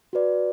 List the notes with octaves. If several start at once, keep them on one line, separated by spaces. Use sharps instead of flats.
F#4 B4 D5